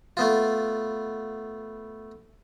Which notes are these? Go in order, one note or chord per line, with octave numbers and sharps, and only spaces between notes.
A3 B3 F4